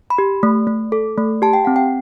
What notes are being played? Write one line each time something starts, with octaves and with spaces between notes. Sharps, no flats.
B5
G4
A3
A3
A4
A3
G4 A5
G5
C4 F#5
G5